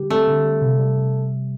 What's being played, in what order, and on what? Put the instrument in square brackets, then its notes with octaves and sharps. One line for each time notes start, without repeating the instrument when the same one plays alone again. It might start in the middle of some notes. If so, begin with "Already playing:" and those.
Already playing: [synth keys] D3 G3 G4
[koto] A3 [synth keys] C4
[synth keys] D3
G3
C3
G3
C3